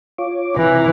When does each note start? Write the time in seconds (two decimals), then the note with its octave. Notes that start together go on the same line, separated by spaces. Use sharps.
0.18 F4 C#5 D6
0.57 C3 E3 A#5